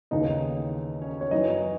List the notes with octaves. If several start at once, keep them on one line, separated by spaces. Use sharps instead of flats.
D#2 C#3 E3 D#4 D#5
C#4 C#5
C#5
F#2 E3 D#4 D#5